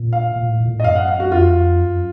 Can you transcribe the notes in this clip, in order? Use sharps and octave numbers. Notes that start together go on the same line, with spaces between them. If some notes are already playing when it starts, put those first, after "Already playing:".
Already playing: A#2
F5
A#2
A2
A#2
A2
D#5
F#2 F5
F#5
F5
F#4
F2 F4
F#2